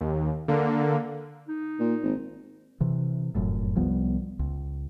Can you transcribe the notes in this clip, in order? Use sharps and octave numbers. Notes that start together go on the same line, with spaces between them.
D#2
D3 A#3
D#4
A#2
G#1
C3 E3
F1 F#2 A2
C2 F3 G3 B3
C#2